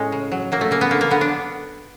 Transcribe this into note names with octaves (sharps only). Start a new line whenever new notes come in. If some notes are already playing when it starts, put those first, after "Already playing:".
Already playing: A2 G#3 C#4
C#3
F#3
F#3 A#3
A3
C#3 A#3
B3
D3 A#3
A#3
D3 B3
D4